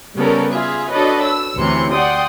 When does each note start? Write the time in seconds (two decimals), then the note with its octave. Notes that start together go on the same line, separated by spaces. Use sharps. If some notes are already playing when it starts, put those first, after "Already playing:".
0.16 C#3 G3 B3 C#4 A4 A#4
0.52 F4 G#4 E5
0.91 D4 F#4 A4 B4 C#5 D#5
1.24 E6
1.59 D2 C3 E3 C#4 C6 C#7
1.92 D5 F#5 G5 C6 D#6